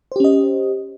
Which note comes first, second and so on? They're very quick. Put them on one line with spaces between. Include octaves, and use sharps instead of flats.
C5 G4 C#4 D#5